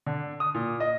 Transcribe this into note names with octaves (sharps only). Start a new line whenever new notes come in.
D3
D#6
A#2
D#5